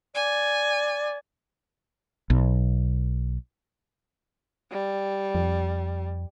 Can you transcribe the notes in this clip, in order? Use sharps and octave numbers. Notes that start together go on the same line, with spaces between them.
D5 G#5
B1
G3
F2